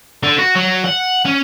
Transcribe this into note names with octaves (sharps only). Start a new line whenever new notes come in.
D3
F#4
F#3
F#5
C#4